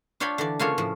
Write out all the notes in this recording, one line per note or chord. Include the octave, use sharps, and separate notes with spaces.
D4 F4 C#5 D5 G5 B5
D3 E3 D5
C#3 A#3 F4 F#4 A4 C#5
A2 F3